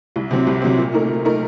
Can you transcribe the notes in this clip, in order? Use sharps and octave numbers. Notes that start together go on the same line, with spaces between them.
C2
C3 F#3 C4
C2
C3 F#3 C4
A#2
A3 D#4 A#4
A#2
A3 D#4 A#4